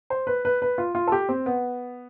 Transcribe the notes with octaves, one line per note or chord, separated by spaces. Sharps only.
C5
B4
B4
B4
F4
F4
A4
G4
C4
B3